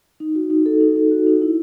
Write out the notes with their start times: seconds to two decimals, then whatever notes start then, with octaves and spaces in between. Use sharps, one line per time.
0.20 D#4
0.35 F#4
0.50 D#4
0.66 A4
0.81 D#4
0.96 D#4
1.11 F#4
1.26 D#4
1.42 E4